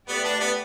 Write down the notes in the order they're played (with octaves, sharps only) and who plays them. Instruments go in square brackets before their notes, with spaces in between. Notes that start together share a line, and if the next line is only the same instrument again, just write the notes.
[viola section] A3 G4 B4 D5 [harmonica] B3
[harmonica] D4
B3